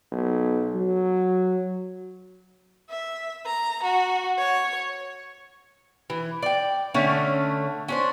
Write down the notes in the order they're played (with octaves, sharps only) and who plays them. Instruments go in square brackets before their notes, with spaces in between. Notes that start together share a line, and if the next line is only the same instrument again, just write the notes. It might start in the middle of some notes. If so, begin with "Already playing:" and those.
[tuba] B1
F#3
[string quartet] E5
A#5
F#4
C#5
[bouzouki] E3
D5 G5
D3 A3 C#4
C#4 D4 C5